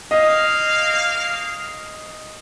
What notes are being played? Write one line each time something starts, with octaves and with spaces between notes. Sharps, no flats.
A#3 D#5 F5